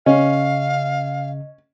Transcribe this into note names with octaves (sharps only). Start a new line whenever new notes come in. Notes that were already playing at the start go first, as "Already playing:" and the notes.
C#3 C#4 D#5 F5